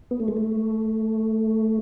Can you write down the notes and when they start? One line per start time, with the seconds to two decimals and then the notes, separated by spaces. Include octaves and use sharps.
0.11 B3
0.20 A3
0.28 G#3
0.37 A3